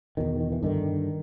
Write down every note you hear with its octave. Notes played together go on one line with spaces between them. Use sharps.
E2 B2 D#3
D#3
E3
G2 D3 D#3